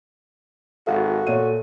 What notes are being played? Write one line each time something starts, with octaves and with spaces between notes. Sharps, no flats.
G#1 F#4 A4 F5
A#2 A3 C#5 D#7